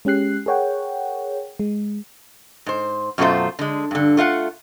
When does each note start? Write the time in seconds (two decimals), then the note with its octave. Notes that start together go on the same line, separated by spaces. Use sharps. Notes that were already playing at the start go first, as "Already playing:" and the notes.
0.05 G#3 C#4 G4 F#6 C7
0.46 G#4 A#4 C#5 F#5 G5
1.60 G#3
2.66 G#2 C5
3.18 F#2 B2 F#3 A3 F4 C5
3.59 D3 G#3
3.91 G2 D3
4.17 A3 F4 F5 F#5